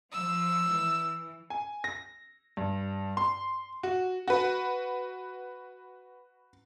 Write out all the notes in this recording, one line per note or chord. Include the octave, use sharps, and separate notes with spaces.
F3 E6
E3
G#5
A#6
G2
C6
F#4
F#4 B4